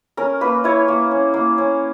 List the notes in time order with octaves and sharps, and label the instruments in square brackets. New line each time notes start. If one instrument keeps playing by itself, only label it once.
[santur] C#4 A#4
A#3 B4
E4 C#5
A#3
C#4
A#3
C#4